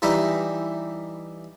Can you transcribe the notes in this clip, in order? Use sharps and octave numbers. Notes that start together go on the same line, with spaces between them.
E3 G3 D#4 E4